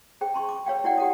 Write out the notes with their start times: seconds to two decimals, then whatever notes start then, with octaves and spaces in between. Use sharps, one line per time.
0.21 G#4 C5 G5
0.34 A5 C6 C#6
0.49 D6
0.66 B4 C#5 F5 G5
0.84 E4 F#4 C#5 D5 F#5 G5
0.97 G4 F#5 A5 D#6